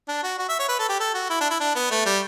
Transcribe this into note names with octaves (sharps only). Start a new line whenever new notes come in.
D4
F#4
F#4
E5
C#5
B4
A4
G4
A4
F#4
E4
D4
E4
D4
B3
A3
G3